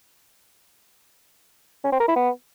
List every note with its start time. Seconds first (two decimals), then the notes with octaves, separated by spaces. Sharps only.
1.84 C#4
1.92 C4
2.00 A#4
2.08 E4
2.16 B3